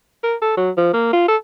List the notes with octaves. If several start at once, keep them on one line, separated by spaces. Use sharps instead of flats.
A#4
A4
F#3
F3
A#3
F4
A4